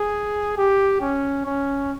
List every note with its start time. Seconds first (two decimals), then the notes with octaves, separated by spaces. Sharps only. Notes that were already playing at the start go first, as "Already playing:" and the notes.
Already playing: G#4
0.57 G4
1.01 C#4
1.45 C#4